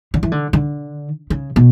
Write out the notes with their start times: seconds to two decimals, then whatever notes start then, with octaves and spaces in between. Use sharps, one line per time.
0.14 D3
0.23 E3
0.32 D3
0.53 D3
1.30 C#3
1.56 B2